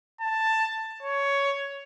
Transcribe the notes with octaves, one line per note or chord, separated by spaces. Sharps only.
A5
C#5